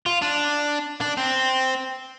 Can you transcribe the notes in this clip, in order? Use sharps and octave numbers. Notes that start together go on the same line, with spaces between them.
F4
D4
D4
C4